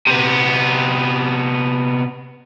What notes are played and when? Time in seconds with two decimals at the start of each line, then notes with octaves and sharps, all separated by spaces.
0.07 C3 B3